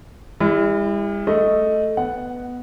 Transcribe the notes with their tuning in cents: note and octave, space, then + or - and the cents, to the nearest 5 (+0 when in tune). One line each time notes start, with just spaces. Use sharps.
G3 +45 E4 +0
A3 +0 D#5 +0
B3 +0 F#5 +0